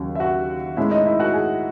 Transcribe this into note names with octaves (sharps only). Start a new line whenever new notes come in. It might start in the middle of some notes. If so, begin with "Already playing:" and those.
Already playing: D#2 C#3 F#3
E5
F#4 F#5
A2 G#3 C#4 E4 E5
D#4 D#5
E4 E5
F#4 F#5
G#4 G#5